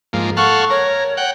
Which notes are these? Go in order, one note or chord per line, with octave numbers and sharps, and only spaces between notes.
G#2 F3 A#3
A4 F5 F#5 C#6
A#4 C#5
F#5 G5